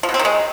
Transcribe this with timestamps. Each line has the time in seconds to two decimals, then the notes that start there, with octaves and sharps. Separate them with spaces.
0.03 F3
0.09 B2
0.14 C4
0.19 D#3
0.25 G#3